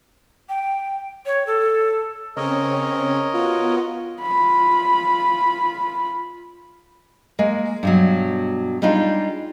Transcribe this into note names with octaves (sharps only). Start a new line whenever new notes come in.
G5
C#5
A4
C#3 C4 C#4 A#4 C#5 D#5
B3 F4 F#4
F4 B5
G#3 A#3 G#5
G2 B2 F#3
G3 G#3 D4 D#4 F4